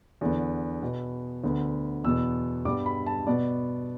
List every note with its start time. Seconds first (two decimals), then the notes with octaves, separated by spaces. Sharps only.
0.21 E2 D3 B3
0.82 B2 B3
1.44 D2 D3 B3
2.04 E2 B2 B3 E6
2.65 G2 G3 B3 D6
2.86 B5
3.06 A5
3.27 B2 B3 D5